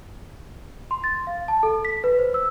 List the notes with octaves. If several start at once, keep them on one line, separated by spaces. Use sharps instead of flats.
C6
A6
F5
A5
A4
B6
B4
C5
E6